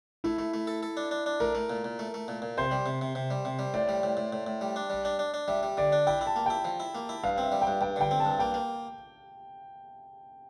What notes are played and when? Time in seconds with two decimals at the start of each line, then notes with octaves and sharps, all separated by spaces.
0.24 A3 E4
0.39 A3
0.54 A3
0.67 A4
0.83 A4
0.97 D4
1.11 D4
1.26 D4
1.40 A3 A#4
1.55 A3
1.70 A#2
1.85 A#2
1.99 A3
2.14 A3
2.28 A#2
2.42 A#2
2.58 C3 C5
2.72 G3
2.86 C3
3.01 C3
3.15 C3
3.31 G3
3.45 C3
3.59 G3
3.74 A2 D5
3.89 G3
4.03 A2
4.17 A2
4.33 A2
4.47 A2
4.61 G3
4.76 D4
4.90 G3
5.05 D4
5.19 D4
5.34 D4
5.48 G3 E5
5.63 G3
5.77 D3 D5
5.92 D4
6.07 E4 G5
6.21 E4
6.27 A5
6.36 A#3
6.46 E4 G5
6.65 F3
6.80 E4
6.95 A#3
7.09 E4
7.24 G2 F5
7.38 C4
7.43 E5
7.52 G3
7.62 G5
7.67 G2
7.81 G2 G5
7.96 D3 G5
8.11 C4
8.20 A5
8.25 G2
8.31 A5
8.39 A#3 G5
8.54 A#3